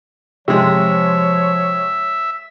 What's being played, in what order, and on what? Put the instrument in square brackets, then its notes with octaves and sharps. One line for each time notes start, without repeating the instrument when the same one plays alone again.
[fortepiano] C3 G#3 [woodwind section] F3 [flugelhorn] C#5 [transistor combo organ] E5